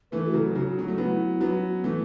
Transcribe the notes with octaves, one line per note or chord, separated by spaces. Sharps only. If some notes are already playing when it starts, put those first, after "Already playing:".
E3 A3 B4
A4
F#4
C#3 F#3 A4
C#3 F#3 F#4
F#3
A3
F#3 B3 E4
F#3 B3 C#4
E3 A3 B3